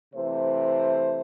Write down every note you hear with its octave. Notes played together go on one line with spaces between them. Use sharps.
C3 E3 A3 C5